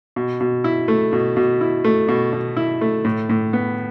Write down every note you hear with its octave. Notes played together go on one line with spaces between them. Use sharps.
B2
B2
E4
A3
B2
B2
E4
A3
B2
B2
E4
A3
A2
A2
B3